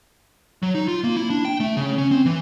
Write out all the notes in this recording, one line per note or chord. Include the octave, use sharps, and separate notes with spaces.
F#3
D#4
F4
A#3
E4
D4
G5
A3
C#3
C#4
C4
E3